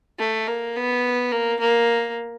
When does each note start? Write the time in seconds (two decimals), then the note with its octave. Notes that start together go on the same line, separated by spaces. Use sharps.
0.19 A3
0.47 A#3
0.76 B3
1.32 A#3
1.60 A#3